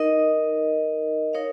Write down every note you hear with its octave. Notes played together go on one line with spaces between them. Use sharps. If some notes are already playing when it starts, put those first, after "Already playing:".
Already playing: D#4 A#4 D#5
D#4 A#4 C#5 F5